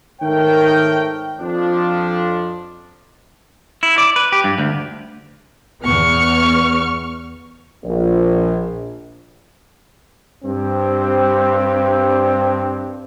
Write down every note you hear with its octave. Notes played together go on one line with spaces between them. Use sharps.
G#2 D#3 A3 A#4 C#5 G5
F2 F3 D4
E4
D5
B4
G4
G2
D2
E2 B3 C#6 F6
A#1
G2 C4